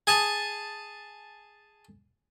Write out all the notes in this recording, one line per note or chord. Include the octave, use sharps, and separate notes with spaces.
G#4 G#5 A5